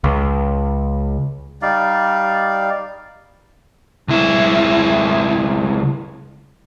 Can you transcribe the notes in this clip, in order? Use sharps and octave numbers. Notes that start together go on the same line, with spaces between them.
C#2
G3 D#4 D5 F5
C#2 E4